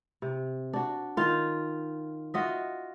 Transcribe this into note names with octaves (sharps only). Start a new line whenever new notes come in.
C3
D4 F#4
D#3 F4
F4 F#4 D#5 E5